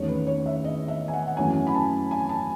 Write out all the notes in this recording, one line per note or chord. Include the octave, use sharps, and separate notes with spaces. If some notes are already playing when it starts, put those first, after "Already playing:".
Already playing: E2 D#3 A3 C#4 C#5
B4
C#5
E5
D#5
E5
G#5
F#5
F#5
F#2 E3 A3 C#4 G#5
B5
A5
G#5
A5